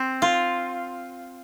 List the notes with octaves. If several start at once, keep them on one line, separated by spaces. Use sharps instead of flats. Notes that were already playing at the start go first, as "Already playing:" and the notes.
Already playing: C4
F4